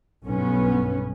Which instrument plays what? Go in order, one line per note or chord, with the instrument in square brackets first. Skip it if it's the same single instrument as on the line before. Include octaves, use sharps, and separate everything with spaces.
[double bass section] B1 G2 B3 C#4